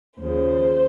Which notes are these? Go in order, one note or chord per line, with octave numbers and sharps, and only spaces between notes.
D#2 C#3 F3 C5